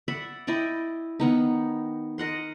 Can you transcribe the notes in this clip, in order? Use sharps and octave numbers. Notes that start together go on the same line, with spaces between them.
D5 E5 F#5 B5
E4 D5 D#5 G5
D#3 B3 D#4
A#4 D#5 F#5 C6